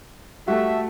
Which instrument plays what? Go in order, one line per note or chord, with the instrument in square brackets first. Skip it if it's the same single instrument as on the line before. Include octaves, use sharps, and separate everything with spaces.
[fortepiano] G3 [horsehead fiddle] A3 [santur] F#4 A4 [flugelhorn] E5